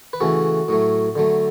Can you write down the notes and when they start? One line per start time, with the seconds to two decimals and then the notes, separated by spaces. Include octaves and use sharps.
0.13 B4
0.20 C#3 E3 A3 F#4 A4
0.68 A2 F#3 A3
1.15 D3 F#3 A3